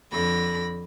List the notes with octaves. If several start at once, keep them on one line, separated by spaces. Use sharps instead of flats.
F2 D3 B5 A#6